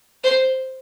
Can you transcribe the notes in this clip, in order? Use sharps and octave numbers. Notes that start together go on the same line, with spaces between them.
C5